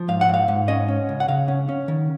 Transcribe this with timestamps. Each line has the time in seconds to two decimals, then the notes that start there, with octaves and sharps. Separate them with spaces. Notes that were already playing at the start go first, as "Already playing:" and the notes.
Already playing: F3
0.08 G#2 F5
0.21 F#5
0.29 G#2
0.34 F5
0.48 G#2
0.68 C#4 D#5
0.88 C#4
1.09 C#2
1.20 F#5
1.28 C#3 F5
1.48 C#4
1.69 C#4
1.88 D#3